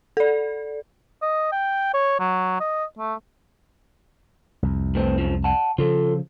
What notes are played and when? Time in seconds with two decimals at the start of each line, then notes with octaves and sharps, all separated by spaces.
0.17 A4 D5
1.22 D#5
1.52 G5
1.94 C#5
2.20 F#3
2.60 D#5
2.99 A3
4.63 C2 F2
4.95 A2 E3 C4
5.18 F#2 C#3 F3
5.44 F#5 A5
5.78 C#3 F3 F4 A4